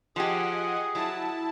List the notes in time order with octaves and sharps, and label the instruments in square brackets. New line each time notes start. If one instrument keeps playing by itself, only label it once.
[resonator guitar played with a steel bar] F3 G4 [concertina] G#4 [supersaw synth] D#5 F#5 G#5
[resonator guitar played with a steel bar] F#3 [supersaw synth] E4 A5